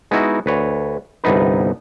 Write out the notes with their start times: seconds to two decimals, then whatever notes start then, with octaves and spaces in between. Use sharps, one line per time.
0.11 G#3 B3 D#4 E4 F#4
0.46 D2 B4 C#5
1.24 G1 C2 B3 D#4 B4